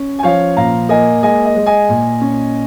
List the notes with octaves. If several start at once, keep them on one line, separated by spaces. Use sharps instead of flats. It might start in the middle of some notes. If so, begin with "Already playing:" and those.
Already playing: C#4
G#5
F3 C#5 F5
A#2 F5 A#5
A#3 D#5 G#5
G#3 D#5 G#5
D#5
G#3
D#5 G#5
A#2
C#4